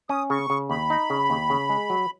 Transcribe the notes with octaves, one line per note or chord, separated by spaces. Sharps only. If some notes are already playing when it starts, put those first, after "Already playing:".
C#4 D#6
C#3 C#6
C#3
D#2 B5
D#4
C#3
D#2
C#3
G#3
F#3